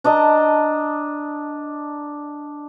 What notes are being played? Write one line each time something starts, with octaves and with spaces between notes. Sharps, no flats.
D4 D#5 A5 A#5